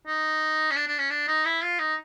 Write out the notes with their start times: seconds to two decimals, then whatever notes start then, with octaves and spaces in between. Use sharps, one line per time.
0.07 D#4
0.71 C#4
0.76 D4
0.88 D4
0.98 C#4
1.10 D4
1.28 D#4
1.45 E4
1.63 F4
1.79 D#4